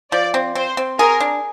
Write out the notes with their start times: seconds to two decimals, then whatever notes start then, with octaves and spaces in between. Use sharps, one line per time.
0.12 F3 D5
0.34 C4
0.55 C4 C5
0.77 C4
0.99 G#4 A#4
1.20 D4